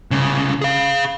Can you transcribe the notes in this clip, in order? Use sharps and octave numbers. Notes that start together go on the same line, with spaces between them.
C2 C#3
G#4 F5